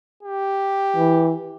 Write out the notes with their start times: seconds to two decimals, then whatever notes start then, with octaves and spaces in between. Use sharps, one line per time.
0.23 G4
0.96 E3